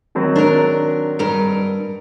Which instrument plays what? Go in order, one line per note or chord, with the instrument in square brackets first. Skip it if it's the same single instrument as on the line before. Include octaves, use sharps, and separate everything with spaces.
[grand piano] D#3 F#3 C4
[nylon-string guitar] D4 A#4
G2 A#4